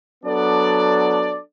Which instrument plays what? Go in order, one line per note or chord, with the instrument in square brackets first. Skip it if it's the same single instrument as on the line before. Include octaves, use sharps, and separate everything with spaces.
[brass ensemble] F#3 B3 D4 A4 D5